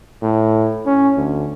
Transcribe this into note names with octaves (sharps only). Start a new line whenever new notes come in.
A2
C#4
D2